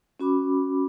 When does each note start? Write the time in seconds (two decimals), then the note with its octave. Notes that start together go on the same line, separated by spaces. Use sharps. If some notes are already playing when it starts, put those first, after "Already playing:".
0.20 C#4 F#4 B5 D6